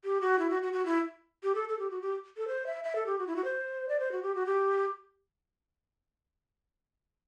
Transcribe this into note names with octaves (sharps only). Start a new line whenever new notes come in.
G4
F#4
E4
F#4
F#4
F#4
E4
G4
A4
A4
G4
F#4
G4
A4
C5
E5
E5
A4
G4
F#4
E4
F#4
C5
D5
C5
F#4
G4
F#4
G4